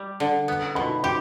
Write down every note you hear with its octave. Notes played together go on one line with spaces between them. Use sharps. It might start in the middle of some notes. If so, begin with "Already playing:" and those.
Already playing: G3
D3
B3
B2 B5
G4 B5